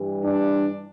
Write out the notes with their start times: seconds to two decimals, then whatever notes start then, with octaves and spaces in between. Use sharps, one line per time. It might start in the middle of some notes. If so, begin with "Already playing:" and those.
Already playing: G2 E3 G3
0.23 D4